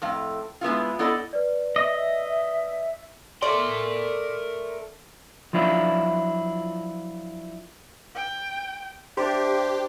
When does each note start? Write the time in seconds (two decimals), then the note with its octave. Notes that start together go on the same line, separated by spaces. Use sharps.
0.02 F2 A2 F5
0.61 G#3 B3 E4 F4
0.99 B3 E4 A4 D5 D#5
1.33 B4 D5
1.76 D#5 E5
3.42 A3 A#4 D5 C6
5.53 F3 F#3 D4 E4 F4
8.15 G5
9.17 D4 G4 C5 E5